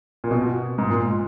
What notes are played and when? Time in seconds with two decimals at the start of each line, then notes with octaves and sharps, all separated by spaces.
0.24 A#2
0.31 B2
0.78 G#2
0.90 A#2